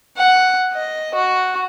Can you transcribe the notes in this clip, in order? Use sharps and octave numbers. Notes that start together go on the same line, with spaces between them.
F#5
D#5
F#4